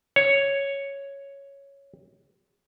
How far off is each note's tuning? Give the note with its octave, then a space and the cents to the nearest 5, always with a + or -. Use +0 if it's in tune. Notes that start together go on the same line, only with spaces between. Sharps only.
C#5 +0